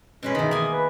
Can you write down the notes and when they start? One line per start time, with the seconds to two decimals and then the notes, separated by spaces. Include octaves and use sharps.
0.23 B2 G#3 C#4 B4
0.35 D#3 E3 D#4
0.51 A#3 G#5 D#6
0.72 B4